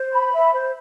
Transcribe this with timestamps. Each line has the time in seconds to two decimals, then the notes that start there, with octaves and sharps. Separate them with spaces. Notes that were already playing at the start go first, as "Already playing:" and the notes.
Already playing: C5
0.12 B5
0.33 E5
0.53 C5